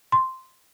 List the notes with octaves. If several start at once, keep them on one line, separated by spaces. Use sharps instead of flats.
C6